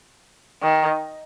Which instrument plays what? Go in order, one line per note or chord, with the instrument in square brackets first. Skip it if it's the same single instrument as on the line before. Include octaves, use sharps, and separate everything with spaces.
[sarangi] D#3